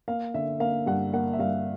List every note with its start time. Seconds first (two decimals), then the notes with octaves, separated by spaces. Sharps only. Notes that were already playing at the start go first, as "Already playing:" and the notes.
0.08 A#3 F5
0.34 D3 E5
0.60 A#3 F5
0.86 G2 F#5
1.13 A#3 F#5
1.33 E5
1.39 G2 F5